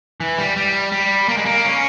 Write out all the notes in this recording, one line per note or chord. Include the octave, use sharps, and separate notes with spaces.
E3
G3
G3
G3
A#3
G#3
A#3
C#4